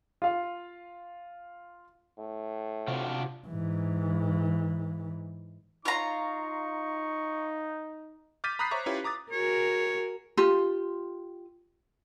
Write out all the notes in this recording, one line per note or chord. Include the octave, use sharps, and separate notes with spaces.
F4 F5
A2
C3 D4 F4 F#4
G#2 E3
D#4 F4 C#5 A#5 C#6
D6 F6 G6 A6 B6 D#7
A#5 B5 D#6 F#6 B6 C7
C5 C#5 E5 A#5 C#6 D6
C#4 E4 F4 G4 B4 C#5
A#5 D6 D#6 A6
F#4 G#4 A#4 C#5
F4 G4